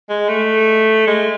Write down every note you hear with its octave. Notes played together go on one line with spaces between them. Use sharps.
G#3
A3
G#3